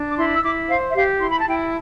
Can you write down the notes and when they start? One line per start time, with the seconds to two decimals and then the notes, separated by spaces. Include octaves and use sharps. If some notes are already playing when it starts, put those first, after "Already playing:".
Already playing: D4
0.09 D6
0.17 E4 C6
0.34 E6
0.43 E4 D6
0.69 C5 F5
0.90 E5
0.94 G4 F5
1.20 E4 C6
1.29 B5
1.38 A5
1.46 E4 G5